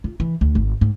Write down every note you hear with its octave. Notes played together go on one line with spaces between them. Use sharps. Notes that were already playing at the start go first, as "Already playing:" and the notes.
F4
E3
D2
G#1
G#2